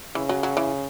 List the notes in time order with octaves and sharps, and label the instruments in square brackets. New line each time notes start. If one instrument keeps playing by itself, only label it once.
[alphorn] C#3 [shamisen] E3
[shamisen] F#3
F#3
E3